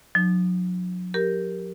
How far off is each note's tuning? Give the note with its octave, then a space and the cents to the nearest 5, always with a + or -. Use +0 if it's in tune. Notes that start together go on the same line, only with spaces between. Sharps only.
F#3 -40 D#4 -30
G4 +0 A#4 +0